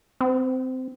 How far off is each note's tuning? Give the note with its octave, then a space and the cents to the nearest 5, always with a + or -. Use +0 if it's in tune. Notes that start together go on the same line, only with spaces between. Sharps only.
C4 -20